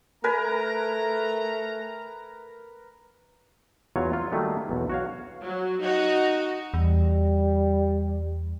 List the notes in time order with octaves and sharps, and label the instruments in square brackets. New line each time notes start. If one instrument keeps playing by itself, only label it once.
[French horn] A3 [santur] A#4 B4 G#5 [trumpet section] A#5
[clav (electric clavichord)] E2 F#3 F4 C#5 F5
F4
D#3 F#3 G3 A3 A#3
B1 E2
F#4 C#5 F5
[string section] F#3
D#4 F#4
[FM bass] E2 [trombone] G3